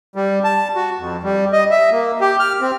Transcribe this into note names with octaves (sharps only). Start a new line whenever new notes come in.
G3
A5
F#4
F2
G3
D#5
E5
A#3
G4
F6
C4